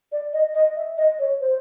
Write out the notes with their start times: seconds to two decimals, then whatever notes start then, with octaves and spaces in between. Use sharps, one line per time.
0.12 D5
0.33 D#5
0.55 D#5
0.76 E5
0.98 D#5
1.19 C#5
1.41 C5